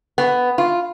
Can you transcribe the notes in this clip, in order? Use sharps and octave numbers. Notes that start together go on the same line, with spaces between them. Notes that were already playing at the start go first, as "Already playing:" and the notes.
B3
F4